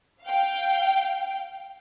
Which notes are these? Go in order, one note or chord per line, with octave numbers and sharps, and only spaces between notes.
F5 G5